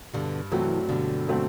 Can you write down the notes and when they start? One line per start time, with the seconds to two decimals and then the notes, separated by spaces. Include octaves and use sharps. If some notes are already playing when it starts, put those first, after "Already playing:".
0.14 G2 B2 D3
0.52 C3 E3 F#3 A3 C4 F#4
0.89 G2 B2 D3
1.27 F#3 A3 C4 F#4